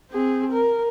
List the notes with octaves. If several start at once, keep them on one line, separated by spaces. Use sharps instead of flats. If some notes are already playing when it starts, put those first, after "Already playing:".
C4 G#4
A#4